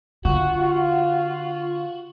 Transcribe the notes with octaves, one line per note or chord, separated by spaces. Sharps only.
D3 F4 F#4